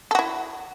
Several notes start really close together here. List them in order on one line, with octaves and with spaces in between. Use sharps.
A4 F#4 E4